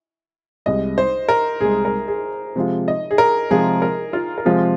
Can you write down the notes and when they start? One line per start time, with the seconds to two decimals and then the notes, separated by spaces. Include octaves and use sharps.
0.66 C2 C3 G#3 D#5
0.98 C5
1.29 A#4
1.61 C2 C3 G#3 G#4
1.85 A#4
2.08 G#4
2.56 C3 F3 G#3 F4
2.88 D#5
3.11 G#4
3.18 A#4
3.50 C3 F3 G#3 F4 G#4
3.82 A#4
4.13 F4
4.38 A#4
4.45 C3 F3 G#3 F4 G#4